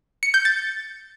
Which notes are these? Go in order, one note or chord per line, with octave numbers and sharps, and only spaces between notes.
C#7
G6
A6